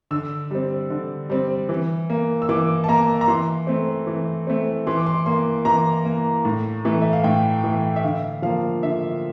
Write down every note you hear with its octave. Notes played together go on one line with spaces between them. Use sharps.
D3 E6
G3 C4
D3
G3 C4
E3
A#3
E6
E3 D6
A5
A#3 A#5
A#5
E3 C6
A3 C4
E3
A3 C4
E3 C6
D6
C6
A#3 C6
E3 A#5
A#3
A2
E3 A3
E5
F5
A2 G5
E3 A3
E5
D3 F5
F3 A#3 F5
D3 E5